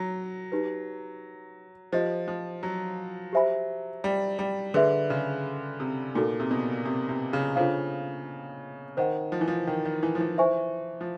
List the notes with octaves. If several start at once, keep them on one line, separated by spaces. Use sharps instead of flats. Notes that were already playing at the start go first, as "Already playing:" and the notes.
Already playing: F#3
D#4 G4 B4
F3 G4 C5 D#5
F3
F#3
G4 C5 E5 G#5 B5
G3
G3
D3 G#4 B4 E5
C#3
C3
A#2 D#4 F#4 A4
C3
B2
C3
C3
C#3
C#3 D4 F4 A4 C5 F5
D#3 C5 D#5 F#5
F3
E3
F3
D#3
D#3
E3
F3
E3
C5 E5 G#5 C#6
F3